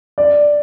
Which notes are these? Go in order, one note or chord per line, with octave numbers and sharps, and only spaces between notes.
D5